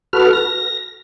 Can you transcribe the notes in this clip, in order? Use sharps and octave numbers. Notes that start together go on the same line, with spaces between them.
F#4 A4 B4 F6
A#6